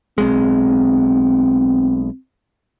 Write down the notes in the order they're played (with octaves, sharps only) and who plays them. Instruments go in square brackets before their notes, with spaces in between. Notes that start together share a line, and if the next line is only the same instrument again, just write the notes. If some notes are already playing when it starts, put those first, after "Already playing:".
[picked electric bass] B1 G#3 [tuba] C4